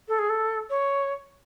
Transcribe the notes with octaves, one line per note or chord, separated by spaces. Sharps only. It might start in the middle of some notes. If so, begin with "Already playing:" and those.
A4
G#4
A4
C#5